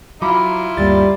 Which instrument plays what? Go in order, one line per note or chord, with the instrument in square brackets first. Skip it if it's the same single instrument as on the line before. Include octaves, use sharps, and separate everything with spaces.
[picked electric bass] F#3 [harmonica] E4 F4 [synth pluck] A#5 B5 D6
[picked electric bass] D2 G2 A#3 [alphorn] G3 [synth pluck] A6